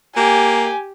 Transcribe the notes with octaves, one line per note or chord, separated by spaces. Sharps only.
A#3 G4 G#5